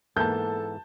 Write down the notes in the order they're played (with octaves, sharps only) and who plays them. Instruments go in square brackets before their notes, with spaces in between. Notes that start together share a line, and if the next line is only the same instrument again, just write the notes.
[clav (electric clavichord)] G#2 E3 B3 [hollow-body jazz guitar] A#3 [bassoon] A4 [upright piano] A5 G6